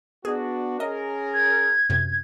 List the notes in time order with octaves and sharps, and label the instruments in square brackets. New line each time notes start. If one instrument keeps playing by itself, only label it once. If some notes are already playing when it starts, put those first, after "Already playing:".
[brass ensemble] B3 D4 F#4 [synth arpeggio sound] G#4
[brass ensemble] C#4 G#4 A#4 [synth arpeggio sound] D#5
[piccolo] G#6
[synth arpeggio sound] F#2 C3